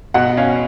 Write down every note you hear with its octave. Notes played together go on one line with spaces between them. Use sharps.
B2 F#5
C#4 F5